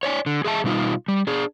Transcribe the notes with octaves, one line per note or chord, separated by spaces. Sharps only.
C#5 D5 G#5
D3
G#4 D#5 E5 A5
B2 G3 D#4 F4
G3
D4 G#4